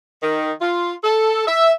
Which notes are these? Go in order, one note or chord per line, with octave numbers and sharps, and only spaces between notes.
D#3
F4
A4
E5